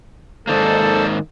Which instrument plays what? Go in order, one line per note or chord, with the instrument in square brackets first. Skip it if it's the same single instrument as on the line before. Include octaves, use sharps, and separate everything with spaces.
[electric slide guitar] G#2 D#3 A#3 [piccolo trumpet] A4 [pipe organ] C5 D5